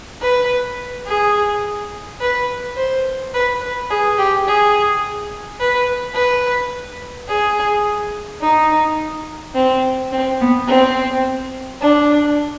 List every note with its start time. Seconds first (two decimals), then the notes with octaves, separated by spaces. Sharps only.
0.22 B4
1.07 G#4
2.20 B4
2.77 C5
3.34 B4
3.61 B4
3.90 G#4
4.19 G4
4.47 G#4
5.60 B4
6.15 B4
7.29 G#4
8.41 D#4
9.55 C4
10.12 C4
10.40 B3
10.67 C4
11.82 D4